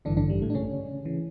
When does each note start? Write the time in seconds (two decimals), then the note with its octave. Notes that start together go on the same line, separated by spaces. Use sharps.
0.05 A1 G2 D3 E3 D4
0.17 D3 D4
0.30 G3
0.42 A2 A3
0.50 D4
0.55 C#3 C#4
1.05 C#3 E3